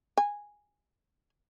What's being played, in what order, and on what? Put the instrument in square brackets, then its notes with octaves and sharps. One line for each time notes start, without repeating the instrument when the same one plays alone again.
[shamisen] G#5